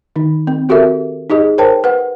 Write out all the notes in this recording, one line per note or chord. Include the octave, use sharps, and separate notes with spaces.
D#3 D#4
C4
C4 F#4 G4 A4 A#4 E5
D#4 G4 G#4 D#5
A#4 C5 C#5 G5 A5
B4 F#5